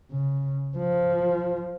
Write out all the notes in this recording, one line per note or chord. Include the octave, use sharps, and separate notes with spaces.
C#3
F3